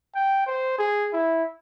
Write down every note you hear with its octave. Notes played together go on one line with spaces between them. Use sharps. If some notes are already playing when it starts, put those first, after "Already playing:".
G5
C5
G#4
E4